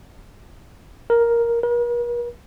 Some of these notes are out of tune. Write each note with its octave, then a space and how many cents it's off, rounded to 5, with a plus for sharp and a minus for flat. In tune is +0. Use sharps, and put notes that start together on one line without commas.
A#4 +5
A#4 +45